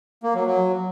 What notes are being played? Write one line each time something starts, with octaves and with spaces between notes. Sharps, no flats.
A#3
F#3
F#3